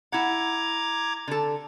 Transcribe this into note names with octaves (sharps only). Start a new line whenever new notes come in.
E4 F#5 A#5 D6 G#6
D3 A4